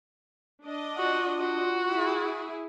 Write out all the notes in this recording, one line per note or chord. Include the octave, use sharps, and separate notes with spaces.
D4 D#5
F4 F#4
F#4
E4 G#4